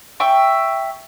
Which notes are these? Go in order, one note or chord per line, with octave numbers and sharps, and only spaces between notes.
E5 G5 C#6